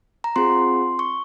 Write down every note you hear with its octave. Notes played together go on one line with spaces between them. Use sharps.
A#5
C4 F4 G#4 C6
C#6